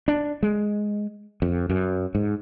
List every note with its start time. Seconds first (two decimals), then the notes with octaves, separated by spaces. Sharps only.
0.08 D4
0.43 G#3
1.42 F2
1.70 F#2
2.15 G#2